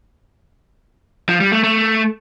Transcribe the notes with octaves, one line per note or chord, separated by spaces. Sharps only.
F3
G3
A3
A3